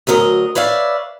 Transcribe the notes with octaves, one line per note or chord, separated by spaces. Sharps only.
D2 F#3 A#4 D5 D#5
B4 C#5 D5 E5 F5